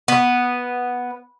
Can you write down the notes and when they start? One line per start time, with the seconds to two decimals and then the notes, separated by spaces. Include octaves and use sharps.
0.08 B3